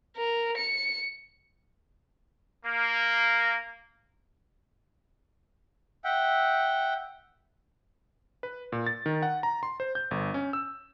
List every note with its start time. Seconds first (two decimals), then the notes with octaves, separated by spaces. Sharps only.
0.17 A#4
0.57 C#7
2.66 A#3
6.04 E5 F#5 G5
8.43 B4
8.72 A#2
8.87 A6
9.06 D#3
9.23 F#5
9.43 A#5
9.63 C6
9.80 C5
9.95 G6
10.11 G1
10.34 C#4
10.53 E6